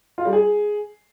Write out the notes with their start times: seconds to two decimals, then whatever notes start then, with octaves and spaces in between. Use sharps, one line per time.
0.18 F4
0.25 G3
0.33 G#4